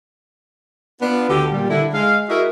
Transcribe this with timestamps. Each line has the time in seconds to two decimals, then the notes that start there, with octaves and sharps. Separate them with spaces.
1.02 B3 D4 F4
1.30 D2 D3 A3 G4
1.51 A#2 G3
1.69 D3 E4
1.94 G#3 F5
2.29 E4 F#4 G#4 A#4 D#5 E5